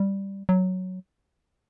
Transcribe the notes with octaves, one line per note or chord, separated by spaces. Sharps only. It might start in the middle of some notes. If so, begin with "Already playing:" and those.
Already playing: G3
F#3